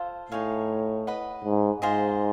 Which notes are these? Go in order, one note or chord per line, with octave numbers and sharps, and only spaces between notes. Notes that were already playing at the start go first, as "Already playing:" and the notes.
Already playing: F4 A4 C5 F5
A2 D#4 G#4 C#5 F5
B4 D#5 F#5
G#2
G#2 F4 G#4 C5 D#5